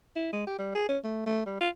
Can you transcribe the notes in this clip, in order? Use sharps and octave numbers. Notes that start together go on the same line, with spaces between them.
E4
G#3
G4
G3
G#4
C#4
A3
A3
G3
F4